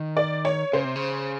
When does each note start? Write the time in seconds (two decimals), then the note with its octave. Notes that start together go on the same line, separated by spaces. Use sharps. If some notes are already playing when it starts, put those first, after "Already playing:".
Already playing: D#3
0.17 D5
0.45 C#5
0.73 C#3 C5
0.84 C3
0.96 C#3